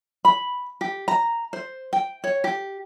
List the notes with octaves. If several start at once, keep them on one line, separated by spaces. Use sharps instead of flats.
B5
G4
A#5
C5
G5
C#5
G4